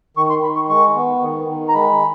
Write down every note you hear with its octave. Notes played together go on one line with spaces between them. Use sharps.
D#3 C#6
C6
D#3 B5
C#6
G#3 C#6
B3
D#3
D#3
A#5
G#3 B5